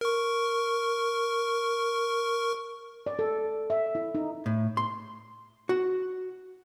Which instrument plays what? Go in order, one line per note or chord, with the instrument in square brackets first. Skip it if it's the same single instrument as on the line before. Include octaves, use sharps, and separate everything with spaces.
[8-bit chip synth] A#4 C#6
[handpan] D5
A4
E5
E4
D#4
[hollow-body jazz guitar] A2
C6
F#4